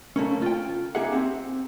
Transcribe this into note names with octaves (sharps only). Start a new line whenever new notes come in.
C#3 A3 A#3 C#4
F4 G5
A#3 D#4 G4 G#4 E5 F#5
C4